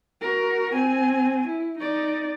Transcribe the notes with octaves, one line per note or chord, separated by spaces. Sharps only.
F#4 A#4
C4 G#5
E4
D#4 D5